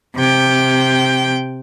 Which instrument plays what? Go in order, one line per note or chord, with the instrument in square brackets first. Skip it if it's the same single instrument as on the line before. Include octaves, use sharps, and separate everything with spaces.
[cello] C3 G5